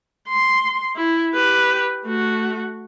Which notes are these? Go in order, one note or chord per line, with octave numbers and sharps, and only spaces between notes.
C6
E4
G4 B4
A3 F#4